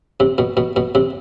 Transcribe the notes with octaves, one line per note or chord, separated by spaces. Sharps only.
C3
B2
B2
B2
C3